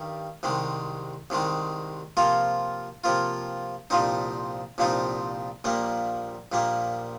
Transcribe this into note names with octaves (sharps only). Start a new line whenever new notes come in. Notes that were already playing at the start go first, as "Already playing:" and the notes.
Already playing: G2 D#3 G3
C2 C3 D#3 G#3
C2 C3 D#3 G#3
C3 F3 A#3 F4
C3 F3 A#3 F4
C2 A#2 F3 C4 D#4
C2 A#2 F3 C4 D#4
A#1 A#2 G3 A#3
A#1 A#2 G3 A#3